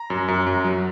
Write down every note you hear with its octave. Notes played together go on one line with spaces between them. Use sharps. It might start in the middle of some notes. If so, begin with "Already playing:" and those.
Already playing: A#5
F#2
F#2
F#2
F#3